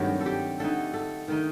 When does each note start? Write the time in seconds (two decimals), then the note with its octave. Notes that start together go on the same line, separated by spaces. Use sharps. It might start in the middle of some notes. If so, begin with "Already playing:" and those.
Already playing: G2 D#3 F#3 A3 C4 G4
0.21 A4
0.26 G4
0.60 D3 A3 D#4 A4
0.94 A4
1.28 D#3 A3 D#4